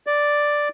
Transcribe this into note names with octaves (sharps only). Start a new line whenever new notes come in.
D5